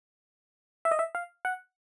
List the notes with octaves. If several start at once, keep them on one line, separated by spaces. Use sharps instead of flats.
E5
D#5
E5
F5
F#5